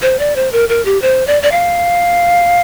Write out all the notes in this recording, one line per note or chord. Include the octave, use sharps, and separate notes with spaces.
C5
D5
C5
A#4
A#4
G4
C5
D5
D5
F5